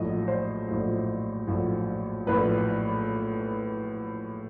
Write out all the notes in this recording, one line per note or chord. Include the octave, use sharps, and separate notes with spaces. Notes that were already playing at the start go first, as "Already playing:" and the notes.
Already playing: A#1 A2 F#3 D#5
C5
A#1 A2 F#3
A#1 A2 F#3
A#1 A2 F#3 B4